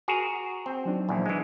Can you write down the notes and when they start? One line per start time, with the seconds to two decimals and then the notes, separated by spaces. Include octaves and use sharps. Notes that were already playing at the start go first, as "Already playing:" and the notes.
0.08 F#4 G#4 A#4
0.66 C4
0.85 F#3 D4 D#4
1.09 A#1 E2
1.26 E3 G#3